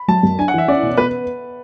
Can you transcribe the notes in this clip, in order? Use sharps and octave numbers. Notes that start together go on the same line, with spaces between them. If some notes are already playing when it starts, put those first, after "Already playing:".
Already playing: B5
F#3 A5
F#2
D4 G#5
F#5
E3 E5
C#4 D5
B2
B3 B4